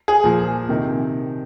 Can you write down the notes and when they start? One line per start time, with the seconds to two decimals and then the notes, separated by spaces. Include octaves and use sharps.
0.08 G#4
0.24 A#2 F3
0.69 C3 D#3